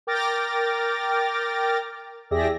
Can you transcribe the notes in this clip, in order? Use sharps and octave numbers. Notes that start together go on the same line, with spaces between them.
A#4 G5 D6 F6 A6 A#6
E2 G4 G#4 D5 E5 A#6